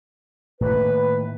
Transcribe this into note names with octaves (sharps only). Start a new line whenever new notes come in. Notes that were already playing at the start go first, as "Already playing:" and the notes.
A2 D#3 A#3 B4